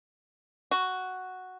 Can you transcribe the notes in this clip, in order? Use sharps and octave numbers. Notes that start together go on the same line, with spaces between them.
F#4